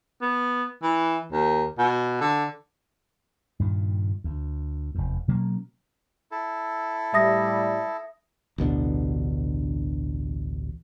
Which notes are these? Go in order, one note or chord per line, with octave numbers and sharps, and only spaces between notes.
B3
E3
D#2
B2
D3
G2 A#2 D#3
D2
F1 E2
B2 F#3 A#3 C#4
E4 A4
A2 G3 E5 D#6 A#6
A1 D2 B2 D3